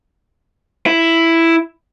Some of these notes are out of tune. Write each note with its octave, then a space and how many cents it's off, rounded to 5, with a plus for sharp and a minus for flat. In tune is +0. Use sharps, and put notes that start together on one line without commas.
E4 +5